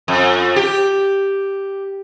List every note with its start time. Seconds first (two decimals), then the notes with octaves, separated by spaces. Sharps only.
0.08 F2
0.56 G4